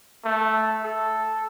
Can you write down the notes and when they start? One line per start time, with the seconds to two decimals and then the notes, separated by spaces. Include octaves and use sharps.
0.25 A3
0.84 A4